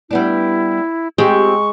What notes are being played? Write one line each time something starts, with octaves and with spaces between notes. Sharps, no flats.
G3 B3 D4 E4
G#3 C4 F4 G4 C#6